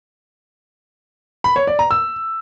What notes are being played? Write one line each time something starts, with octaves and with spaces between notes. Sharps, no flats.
B5
C#5
D5
A#5
E6